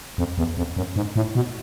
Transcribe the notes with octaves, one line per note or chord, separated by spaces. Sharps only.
F2
E2
F2
F#2
G#2
A2
B2